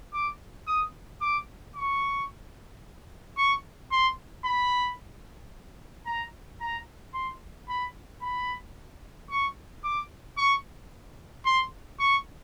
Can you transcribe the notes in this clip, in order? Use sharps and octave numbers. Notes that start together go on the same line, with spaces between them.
D6
D#6
D6
C#6
C#6
C6
B5
A#5
A#5
C6
B5
B5
C#6
D6
C#6
C6
C#6